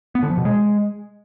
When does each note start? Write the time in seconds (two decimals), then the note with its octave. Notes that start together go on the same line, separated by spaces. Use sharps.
0.15 B3
0.23 D3
0.30 F3
0.38 B2
0.45 G#3